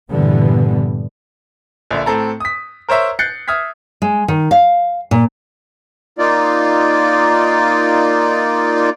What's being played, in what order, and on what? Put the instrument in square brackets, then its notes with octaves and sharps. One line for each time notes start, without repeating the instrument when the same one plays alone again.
[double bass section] G2 A#2 D3 E3 G3 B3
[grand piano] A#1 D3 E5
A2 C4 A4 A#5
D#6 B6
A#4 C5 C#5 E5 A#5
F#6 G6 A6 C7 C#7
E5 D#6 F6 G#6 B6
[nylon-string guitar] G#3
D#3
F5
A#2
[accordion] A#3 D#4 F4 D5